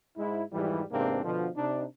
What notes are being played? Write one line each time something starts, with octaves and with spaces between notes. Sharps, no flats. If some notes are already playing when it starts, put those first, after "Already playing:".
G#2 E4
F2 G#2 E3 F3 G3
E2 G#2 C3 A#3 C4 D4
B2 D3 F3
C3 D4 D#4